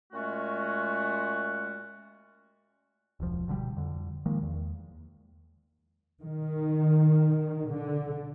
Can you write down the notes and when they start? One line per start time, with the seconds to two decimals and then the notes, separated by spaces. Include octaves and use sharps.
0.13 A#2 G#3 A3 C#4 F#4
3.20 E1 C#2 F3
3.48 B2 D3 F#3 G3
3.77 F2 D3
4.26 D#3 F3 G#3 A#3
4.43 E2
6.22 D#3
7.70 D3